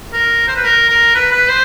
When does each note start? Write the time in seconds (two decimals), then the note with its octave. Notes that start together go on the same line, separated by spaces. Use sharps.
0.13 A#4
0.47 C5
0.56 B4
0.64 A#4
0.90 A#4
1.15 B4
1.31 B4
1.48 C5